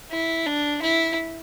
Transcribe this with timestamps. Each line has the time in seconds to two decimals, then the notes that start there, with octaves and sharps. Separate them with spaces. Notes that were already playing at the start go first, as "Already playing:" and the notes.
0.12 E4
0.47 D4
0.82 E4